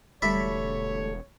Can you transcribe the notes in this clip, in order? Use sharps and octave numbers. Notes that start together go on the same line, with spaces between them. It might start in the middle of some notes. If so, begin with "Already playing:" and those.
E1 D3 G3 A3 C#5 D5 E5 B5